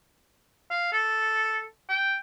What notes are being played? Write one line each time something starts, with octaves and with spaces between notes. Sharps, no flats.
F5
A4
G5